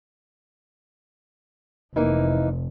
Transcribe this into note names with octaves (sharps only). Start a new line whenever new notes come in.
F1 E3 A#3 D#4